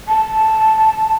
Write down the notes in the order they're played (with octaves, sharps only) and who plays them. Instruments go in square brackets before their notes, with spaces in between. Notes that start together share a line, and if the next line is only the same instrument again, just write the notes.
[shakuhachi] A5